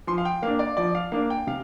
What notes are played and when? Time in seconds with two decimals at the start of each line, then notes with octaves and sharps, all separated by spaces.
0.07 F3 C6
0.18 F5
0.25 G5
0.42 A#3 D4 F5
0.59 D5
0.77 F3 D5
0.95 F5
1.12 A#3 D4 F5
1.30 G5
1.47 C3 F5